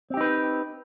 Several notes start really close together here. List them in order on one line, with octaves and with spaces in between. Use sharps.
C4 G4 D#4 B4